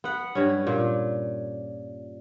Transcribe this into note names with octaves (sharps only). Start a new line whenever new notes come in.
B3 F#5
G2 C#4
A#2